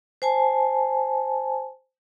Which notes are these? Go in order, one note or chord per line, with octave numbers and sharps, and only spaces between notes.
C5 G#5 A5